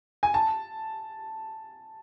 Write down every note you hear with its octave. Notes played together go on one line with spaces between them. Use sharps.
G#5
A5